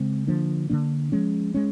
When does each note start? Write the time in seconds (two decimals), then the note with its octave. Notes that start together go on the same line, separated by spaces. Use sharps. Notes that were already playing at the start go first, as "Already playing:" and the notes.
Already playing: C#3 G#3 C4
0.27 D3 F3 A#3 D4
0.70 D3 F3 A#3 D4
1.12 F3 G#3 C#4
1.54 G#3 C#4